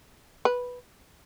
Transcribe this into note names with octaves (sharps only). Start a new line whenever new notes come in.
B4